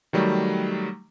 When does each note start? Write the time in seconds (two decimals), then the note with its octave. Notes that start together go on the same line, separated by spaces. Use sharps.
0.13 D#3 F#3 G3 A3